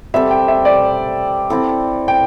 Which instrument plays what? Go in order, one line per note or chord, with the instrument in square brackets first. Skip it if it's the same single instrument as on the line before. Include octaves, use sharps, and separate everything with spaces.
[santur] G3 C4 A4 [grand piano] E5
[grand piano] G5
E5
D5
[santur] C4 E4 A4
[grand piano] G5